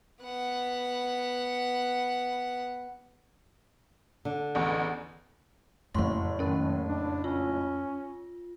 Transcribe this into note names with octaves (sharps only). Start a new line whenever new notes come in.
B3 F#5
D3
A1 E2
F#1 F2 A2 A3 C6 C#6
D#3 C#4 A#4
D4
C#4 F4